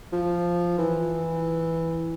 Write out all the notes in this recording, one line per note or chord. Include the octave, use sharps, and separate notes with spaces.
F3
E3